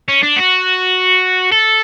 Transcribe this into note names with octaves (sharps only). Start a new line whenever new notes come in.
C#4
D4
F#4
A4